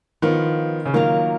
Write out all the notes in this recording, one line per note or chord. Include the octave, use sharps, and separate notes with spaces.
D#3 F3 B3 F4
C#3
D#3 F#3 A#3 F4 A#4 F5